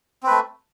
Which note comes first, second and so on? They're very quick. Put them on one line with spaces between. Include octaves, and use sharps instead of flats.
C4 B4 A3